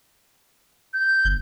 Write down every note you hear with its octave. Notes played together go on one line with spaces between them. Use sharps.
G6
G1